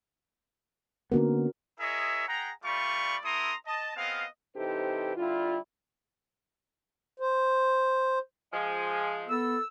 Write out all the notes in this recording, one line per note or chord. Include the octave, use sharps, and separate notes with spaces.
D3 A#3 B3 C#4 F#4 A#4
E4 G#4 A#4 C#5 D#5 E5
G#4 F#5 G5 A#5
G3 A3 F4 D5 B5 C#6
B3 E4 A4 A#5 C6 D#6
D#5 A5
B3 C4 G#4 D#5 F5
C3 E3 D#4 G4 A4 C5
D3 G3 E4 F4
C5
F3 G#3 G#5
B3 A4 E6